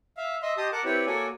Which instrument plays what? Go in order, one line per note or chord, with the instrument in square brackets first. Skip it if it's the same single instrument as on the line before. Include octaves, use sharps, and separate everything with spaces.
[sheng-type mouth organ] E5 F5
D#5 E5 C6
G4 D#5 A5 C6 D#6
A#4 F#5 A5 D6
C4 E4 G4 B4 C#5 D5
A#3 F#4 A4 C#5 D5 G#5